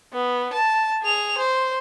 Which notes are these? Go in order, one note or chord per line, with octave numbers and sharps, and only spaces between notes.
B3
A5
G#4 F7
C5